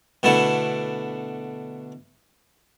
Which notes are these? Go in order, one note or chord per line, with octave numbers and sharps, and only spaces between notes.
B2 D3 A3 B3 E4